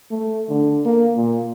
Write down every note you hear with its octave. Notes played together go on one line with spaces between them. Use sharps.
A3
D3
A#3
A#2